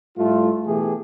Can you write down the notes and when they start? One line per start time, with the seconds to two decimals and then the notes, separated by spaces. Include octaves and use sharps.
0.18 A2 G3 A3 F4
0.66 B2 E3 A3 G4 G#4